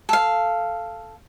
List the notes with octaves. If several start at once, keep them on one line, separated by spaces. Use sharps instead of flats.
A4 F5